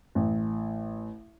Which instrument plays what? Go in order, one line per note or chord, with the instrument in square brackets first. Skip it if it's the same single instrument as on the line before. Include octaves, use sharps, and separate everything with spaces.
[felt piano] A1